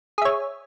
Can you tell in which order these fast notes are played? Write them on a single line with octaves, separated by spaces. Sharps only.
G#4 E5 C#5